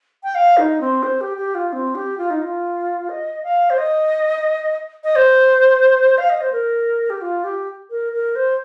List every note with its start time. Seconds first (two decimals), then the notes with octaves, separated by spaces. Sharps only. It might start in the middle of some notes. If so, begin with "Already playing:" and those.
0.23 G5
0.35 F5
0.57 D#4
0.81 C4
1.03 C5
1.21 G4
1.37 G4
1.55 F4
1.73 C4
1.95 G4
2.18 F4
2.30 D#4
2.42 F4
3.09 D#5
3.43 F5
3.70 C5
3.78 D#5
5.04 D#5
5.16 C5
6.18 F5
6.30 D#5
6.41 C5
6.52 A#4
7.10 G4
7.21 F4
7.44 G4
7.90 A#4
8.13 A#4
8.35 C5